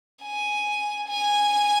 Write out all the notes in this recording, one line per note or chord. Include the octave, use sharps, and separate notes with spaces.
G#5
G#5